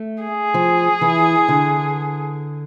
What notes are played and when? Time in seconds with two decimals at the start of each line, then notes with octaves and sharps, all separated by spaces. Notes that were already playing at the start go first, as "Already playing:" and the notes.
Already playing: A3
0.23 G#4
0.54 F3
1.01 E3
1.48 D3